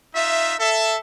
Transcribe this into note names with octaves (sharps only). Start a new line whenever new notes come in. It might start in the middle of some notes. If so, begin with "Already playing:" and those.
D#4 F4 E5
A4 E5